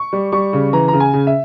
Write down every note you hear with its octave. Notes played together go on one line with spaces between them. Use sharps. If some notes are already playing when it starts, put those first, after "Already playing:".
Already playing: C#6
G3
G3 C#6
C#3
E3 A#5
C#3 A#5
G#5
C#3
E5